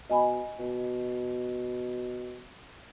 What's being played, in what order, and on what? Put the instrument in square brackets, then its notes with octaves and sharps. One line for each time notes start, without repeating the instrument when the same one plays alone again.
[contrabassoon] B2 [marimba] D#5 G#5 B5
[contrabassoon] B2